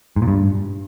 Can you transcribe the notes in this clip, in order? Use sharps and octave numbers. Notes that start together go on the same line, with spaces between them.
G#2
A#2
G2